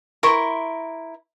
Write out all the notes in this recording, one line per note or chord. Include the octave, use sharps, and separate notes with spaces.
E4 A#4 C6 C#6